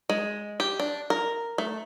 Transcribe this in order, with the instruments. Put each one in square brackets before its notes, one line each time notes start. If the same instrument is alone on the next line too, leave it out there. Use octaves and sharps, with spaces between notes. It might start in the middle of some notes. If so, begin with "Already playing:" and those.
[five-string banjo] G#3
G4
D4
A#4
A3